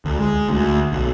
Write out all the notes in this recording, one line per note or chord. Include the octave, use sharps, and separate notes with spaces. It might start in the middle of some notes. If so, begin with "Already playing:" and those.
D2
G#3
D2
B1